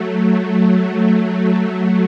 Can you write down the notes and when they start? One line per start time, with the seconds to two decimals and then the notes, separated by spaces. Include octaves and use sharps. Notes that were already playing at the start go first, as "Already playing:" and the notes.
Already playing: F#3 A3
0.60 F#3 A3
1.72 F#3 A3